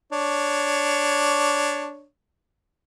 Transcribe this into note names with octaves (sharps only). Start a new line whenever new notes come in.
D4 C#5